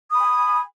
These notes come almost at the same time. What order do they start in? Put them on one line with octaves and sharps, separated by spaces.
D#6 B5 G#5